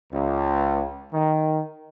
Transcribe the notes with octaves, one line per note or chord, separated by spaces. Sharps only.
C#2
D#3